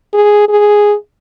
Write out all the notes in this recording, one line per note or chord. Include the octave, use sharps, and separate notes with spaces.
G#4
G#4